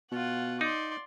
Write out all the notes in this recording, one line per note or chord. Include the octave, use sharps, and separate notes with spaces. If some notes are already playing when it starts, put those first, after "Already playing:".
B2 F4 F#5
D#4 D5 C6